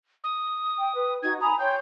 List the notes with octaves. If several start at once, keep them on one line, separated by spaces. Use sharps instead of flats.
D#6
G5
B4
D#4 F#4 G#6
G#5 A#5 B5 D#6
C#5 G5 C6 G6